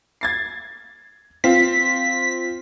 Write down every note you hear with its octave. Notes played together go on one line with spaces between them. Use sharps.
G#6 A6 C7
C4 F4 B6